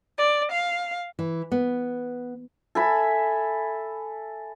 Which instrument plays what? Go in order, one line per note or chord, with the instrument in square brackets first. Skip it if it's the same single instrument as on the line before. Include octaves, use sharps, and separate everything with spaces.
[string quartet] D5
F5
[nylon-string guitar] E3
B3
[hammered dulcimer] A4 E5 G#5 B5